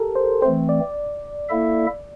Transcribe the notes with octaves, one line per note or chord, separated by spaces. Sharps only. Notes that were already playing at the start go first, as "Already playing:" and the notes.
Already playing: G4 A4 A#4
C5
E3 A3 C4 C5
D5
A#3 E4 A4 E5